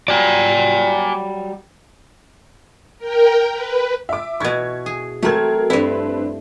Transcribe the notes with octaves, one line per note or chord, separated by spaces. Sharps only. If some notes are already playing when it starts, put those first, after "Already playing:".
F#3 G3 D5 G#5
A#4 G5
B4
E5 D6
B2 E4 C#6 G#6
G#4
F#3 A3 C4 A#4 G#6
G2 C4 D4 E4 B4